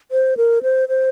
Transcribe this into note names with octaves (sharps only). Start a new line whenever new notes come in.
C5
A#4
C5
C5